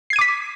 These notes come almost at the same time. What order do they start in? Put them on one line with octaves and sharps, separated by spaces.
C7 G#6 D#7 D6 B6